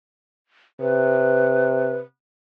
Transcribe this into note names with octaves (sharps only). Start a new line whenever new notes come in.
C3 B4